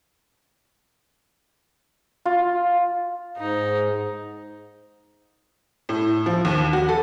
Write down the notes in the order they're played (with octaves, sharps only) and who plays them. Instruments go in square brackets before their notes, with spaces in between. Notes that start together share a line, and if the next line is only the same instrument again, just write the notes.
[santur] F4
[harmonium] G#2 [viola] D#4
[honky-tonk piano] A2
F3
D#2
F#4
A4